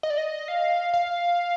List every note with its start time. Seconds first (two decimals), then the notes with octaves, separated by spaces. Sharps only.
0.03 D#5
0.10 D5
0.18 D#5
0.48 F5
0.94 F5